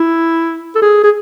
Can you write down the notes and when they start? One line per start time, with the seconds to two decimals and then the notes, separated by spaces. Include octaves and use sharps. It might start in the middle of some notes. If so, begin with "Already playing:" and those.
Already playing: E4
0.75 A4
0.82 G#4
1.04 G#4